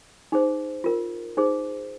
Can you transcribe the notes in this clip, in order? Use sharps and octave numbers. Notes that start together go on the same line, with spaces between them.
D#4 G#4 C5
F4 A#4
D#4 G#4 C5